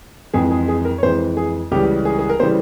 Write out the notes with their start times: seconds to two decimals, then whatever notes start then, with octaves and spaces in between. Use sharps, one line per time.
0.33 F2 E3 G#3 G#4
0.51 G#4
0.68 G#4
0.85 A#4
0.98 C#5
1.03 F2 E3 G#3 C5
1.37 G#4
1.71 C#2 C#3 E3 G3 G4
2.05 G#4
2.19 G#4
2.29 A#4
2.40 C#3 E3 G3 C5